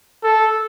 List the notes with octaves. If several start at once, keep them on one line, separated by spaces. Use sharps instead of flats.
A4